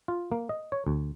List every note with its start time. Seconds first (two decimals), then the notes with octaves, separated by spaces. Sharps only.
0.08 F4
0.32 A#3
0.49 D#5
0.72 C#5
0.87 D2